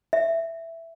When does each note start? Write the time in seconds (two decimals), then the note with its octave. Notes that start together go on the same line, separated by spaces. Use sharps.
0.13 E5